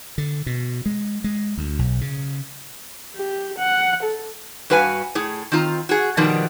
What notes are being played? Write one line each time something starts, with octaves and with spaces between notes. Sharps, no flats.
D3
B2
G#3
G#3
D2
B1
C#3
G4
F#5
A4
G2 F#4 B4 F5 G#5
A2 G#4
D#3 C4 F4 A#5
F#4 G#4
B2 D#3 F3 G3 B3